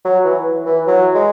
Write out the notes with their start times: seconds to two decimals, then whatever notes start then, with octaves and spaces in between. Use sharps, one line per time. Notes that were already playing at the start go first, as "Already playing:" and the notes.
0.05 F#3
0.24 E3
0.66 E3
0.87 F#3
1.15 G#3